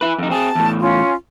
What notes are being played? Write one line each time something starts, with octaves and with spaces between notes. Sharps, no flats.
E4 B4
F2 D#4
C4 G#4 A5
E2 A2
C#4 F4